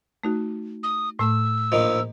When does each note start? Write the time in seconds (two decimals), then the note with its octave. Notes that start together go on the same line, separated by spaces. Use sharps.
0.23 A3 D#4 F#4
0.83 D#6
1.19 A2 A3 E6
1.72 A#1 D#3 F3 D#5